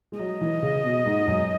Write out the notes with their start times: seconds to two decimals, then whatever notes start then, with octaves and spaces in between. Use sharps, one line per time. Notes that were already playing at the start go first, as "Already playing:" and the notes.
0.12 G#3
0.19 F#3 D#5
0.41 E3
0.62 C#3
0.84 B2
1.06 G#2
1.27 F#2